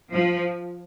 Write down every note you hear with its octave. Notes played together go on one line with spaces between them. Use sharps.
F3